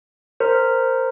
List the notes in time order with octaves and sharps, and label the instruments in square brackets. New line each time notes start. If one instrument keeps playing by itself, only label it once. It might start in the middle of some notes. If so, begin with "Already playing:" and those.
[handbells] A#4 C5